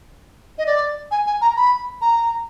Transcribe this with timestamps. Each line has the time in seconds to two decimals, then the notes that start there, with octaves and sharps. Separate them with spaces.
0.58 D#5
0.66 D5
1.11 G#5
1.27 G#5
1.42 A#5
1.57 B5
2.01 A#5